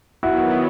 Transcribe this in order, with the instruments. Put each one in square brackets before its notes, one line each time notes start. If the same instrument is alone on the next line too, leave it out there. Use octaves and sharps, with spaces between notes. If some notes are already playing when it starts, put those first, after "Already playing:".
[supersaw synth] D#3 F#3 B3 [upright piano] E4 F#4